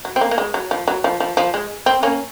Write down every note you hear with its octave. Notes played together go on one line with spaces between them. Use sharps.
F#3
C4
A#3
A#3
G#3
F#3
F3
F#3
F3
F3
F3
G#3
C4
A#3 C#4